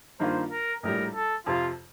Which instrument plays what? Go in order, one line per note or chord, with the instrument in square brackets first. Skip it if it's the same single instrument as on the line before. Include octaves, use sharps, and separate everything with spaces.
[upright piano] G2 D#3 A#3 F4 [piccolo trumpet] C5
[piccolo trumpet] A#4
[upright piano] A#1 A2 G3 [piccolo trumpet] A#4
[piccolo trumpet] A4
[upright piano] F2 C3 F3 [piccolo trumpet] F4